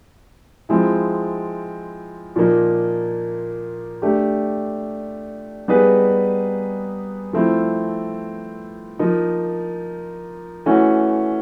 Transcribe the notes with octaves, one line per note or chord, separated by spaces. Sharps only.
F3 G#3 C4 E4
A#2 F3 A#3 D#4
A3 D4 G4
G3 B3 D#4 G#4 B4
F3 A3 C4 E4
F3 A#3 D#4
E3 A3 C#4 F#4